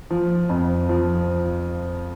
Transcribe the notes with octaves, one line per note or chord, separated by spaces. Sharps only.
F3
F2
F3